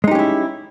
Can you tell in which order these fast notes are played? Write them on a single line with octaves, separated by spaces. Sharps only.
G#3 D#4 G4 C#4 E4